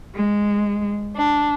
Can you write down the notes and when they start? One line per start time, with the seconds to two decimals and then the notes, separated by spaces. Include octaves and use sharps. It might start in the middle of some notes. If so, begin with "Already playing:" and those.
0.16 G#3
1.16 D4